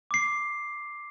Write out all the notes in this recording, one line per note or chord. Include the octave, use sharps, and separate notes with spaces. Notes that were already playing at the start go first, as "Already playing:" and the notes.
D6 C7